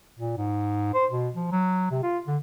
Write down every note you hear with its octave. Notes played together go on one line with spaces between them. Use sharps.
A#2
G#2
C5
B2
F3
F#3
C3
F4
D3